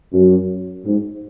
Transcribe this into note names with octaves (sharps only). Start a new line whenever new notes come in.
F#2
G#2